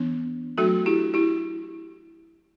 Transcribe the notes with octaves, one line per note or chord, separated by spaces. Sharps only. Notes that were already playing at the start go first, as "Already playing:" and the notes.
Already playing: E3 B3 D4
F#3 A3 D4 F#4 A4
E4 G4
E4 G4